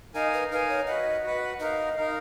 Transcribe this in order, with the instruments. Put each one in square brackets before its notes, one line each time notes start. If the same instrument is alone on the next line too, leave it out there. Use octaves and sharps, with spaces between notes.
[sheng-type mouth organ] D#4 A#4 F5 G#5 [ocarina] D#5
[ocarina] B4
[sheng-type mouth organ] D#4 A#4 F5 G#5 [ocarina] B4
[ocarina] C#5
[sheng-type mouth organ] F#4 B4 F#5 [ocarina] D#5
[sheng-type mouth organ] F#4 B4 F#5
[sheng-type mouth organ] D#4 A#4 F5 [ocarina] D#5
[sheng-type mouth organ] D#4 A#4 F5